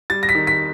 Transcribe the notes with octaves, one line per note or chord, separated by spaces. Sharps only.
G3 A6
A#6
B6
D#3
B6